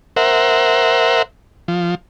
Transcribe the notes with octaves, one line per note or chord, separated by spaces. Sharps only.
A#4 C5 E5 F#5
F3